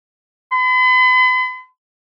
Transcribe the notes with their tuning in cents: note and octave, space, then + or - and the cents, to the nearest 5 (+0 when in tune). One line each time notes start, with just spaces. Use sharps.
B5 +45